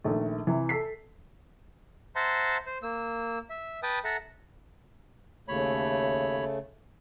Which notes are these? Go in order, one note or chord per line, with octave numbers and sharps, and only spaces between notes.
A#1 D#3 A3
C3 E3
A4 B6 C7
C5 E5 F#5 A5 A#5 C6
C5
A#3 E6
E5
B4 G5 A5 D#6
A4 E5 F#5 A#5
D#2 C#3 A3 C#5 B5